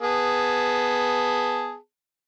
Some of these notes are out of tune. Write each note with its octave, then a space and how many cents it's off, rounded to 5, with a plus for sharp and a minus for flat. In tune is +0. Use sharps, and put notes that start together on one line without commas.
B3 +0 G#4 +0 A5 +0